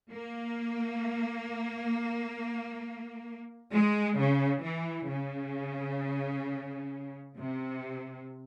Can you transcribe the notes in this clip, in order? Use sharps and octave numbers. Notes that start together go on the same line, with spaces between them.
A#3
G#3
C#3
E3
C#3
C3